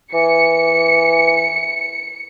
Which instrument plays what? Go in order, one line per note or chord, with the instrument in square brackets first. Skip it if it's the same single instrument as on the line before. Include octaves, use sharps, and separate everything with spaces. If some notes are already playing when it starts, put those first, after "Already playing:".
[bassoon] E3 [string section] C#7